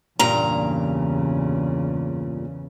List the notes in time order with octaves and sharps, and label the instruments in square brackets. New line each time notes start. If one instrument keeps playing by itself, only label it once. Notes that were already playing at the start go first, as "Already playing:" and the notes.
[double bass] E2 C#3 [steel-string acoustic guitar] G2 A#2 A#5